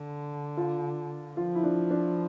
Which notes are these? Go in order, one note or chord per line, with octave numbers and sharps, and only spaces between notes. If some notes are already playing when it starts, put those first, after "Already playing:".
Already playing: D3
F4
F3 F4
E4
D4
D4